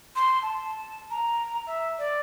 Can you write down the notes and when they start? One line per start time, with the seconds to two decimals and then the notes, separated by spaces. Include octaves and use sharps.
0.16 C6
0.42 A5
1.11 A#5
1.67 E5
1.99 D5